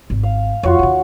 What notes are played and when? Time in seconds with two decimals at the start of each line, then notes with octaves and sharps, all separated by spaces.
0.10 G#1
0.23 F5
0.63 F2 F4 F#4 C#5
0.79 D#2 D#3